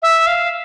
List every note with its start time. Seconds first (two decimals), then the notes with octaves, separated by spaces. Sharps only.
0.02 E5
0.27 F5